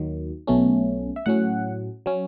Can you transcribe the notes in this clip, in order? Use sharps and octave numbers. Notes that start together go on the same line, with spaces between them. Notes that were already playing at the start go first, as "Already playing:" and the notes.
Already playing: D#2 D#3 F#3
B1 B2 A3 C#4
E5
A2 F#3 C#4 F#5
F#3 C#4